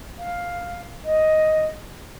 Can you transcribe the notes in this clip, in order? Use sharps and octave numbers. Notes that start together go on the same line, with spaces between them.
F5
D#5